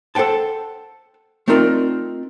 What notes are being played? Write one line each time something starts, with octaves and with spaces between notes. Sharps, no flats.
A4 C5 F#5 G5 A5
A3 C4 D#4 F4 A#4 D5